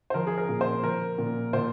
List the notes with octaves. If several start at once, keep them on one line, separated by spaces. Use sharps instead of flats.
C5
F3 A#4
G#4
A#4
A#2
C5
F3 A#4
A#2
A#2 C5